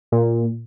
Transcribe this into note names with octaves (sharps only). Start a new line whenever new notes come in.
A#2